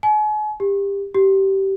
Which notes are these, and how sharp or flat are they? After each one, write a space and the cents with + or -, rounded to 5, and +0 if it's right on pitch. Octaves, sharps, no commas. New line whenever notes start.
G#5 +40
G4 +25
G4 -20